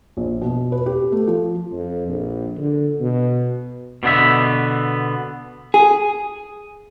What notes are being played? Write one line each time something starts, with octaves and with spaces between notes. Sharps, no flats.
A#1
B2
B4
G4
A3
F3
F2
A#1
D3
B2
B2 D3 B3 E5
G#4